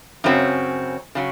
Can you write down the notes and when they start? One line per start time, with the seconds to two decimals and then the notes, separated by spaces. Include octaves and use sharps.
0.24 F#2 C#3 F#3 C4
1.15 C#3 F#3